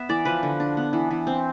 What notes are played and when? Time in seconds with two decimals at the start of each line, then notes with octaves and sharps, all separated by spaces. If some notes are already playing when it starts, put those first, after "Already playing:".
Already playing: B3 E5
0.09 E3 D5
0.25 F3 B4
0.43 D3
0.60 D4
0.77 B3
0.93 E3
1.11 E3
1.27 C4